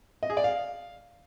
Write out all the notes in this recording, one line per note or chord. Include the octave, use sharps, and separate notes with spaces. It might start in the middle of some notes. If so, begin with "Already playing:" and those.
D#5
G#4
D5
F5